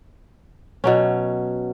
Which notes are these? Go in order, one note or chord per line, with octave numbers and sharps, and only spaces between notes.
B2 F#3 C#4